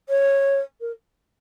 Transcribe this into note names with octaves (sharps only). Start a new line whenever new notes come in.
C#5
A#4